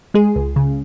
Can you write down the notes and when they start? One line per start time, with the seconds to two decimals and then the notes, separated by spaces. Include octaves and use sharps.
0.14 G#3 G#4
0.36 C#2
0.56 C#3